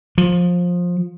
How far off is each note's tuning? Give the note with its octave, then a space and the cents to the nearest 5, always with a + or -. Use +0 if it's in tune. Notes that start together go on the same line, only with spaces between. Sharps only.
F3 +20